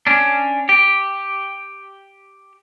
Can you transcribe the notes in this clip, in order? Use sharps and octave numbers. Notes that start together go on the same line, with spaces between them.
C#4 D4
G4